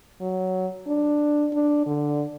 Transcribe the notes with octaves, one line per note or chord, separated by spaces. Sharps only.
F#3
D4
D4
D3